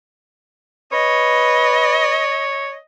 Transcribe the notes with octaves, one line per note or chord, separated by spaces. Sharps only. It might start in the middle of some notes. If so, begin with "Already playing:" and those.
B4 C#5 D#5